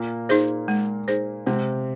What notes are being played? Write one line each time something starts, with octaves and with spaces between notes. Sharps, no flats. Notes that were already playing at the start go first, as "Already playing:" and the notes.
Already playing: A#2 A#3
D#4 G#4 C5
G#3
D#4 G#4 C5
C3 G#3 C4